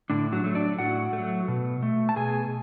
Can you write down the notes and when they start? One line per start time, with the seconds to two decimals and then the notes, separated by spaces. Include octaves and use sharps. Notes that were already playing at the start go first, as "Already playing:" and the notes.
0.10 A2 D3 D4
0.33 F#3 F#4
0.44 F#3 A3
0.55 D4 D5
0.79 A2 F#4 F#5
1.13 A3
1.18 F#3
1.48 B2
1.83 A3
2.09 A5
2.16 B2 G#4 G#5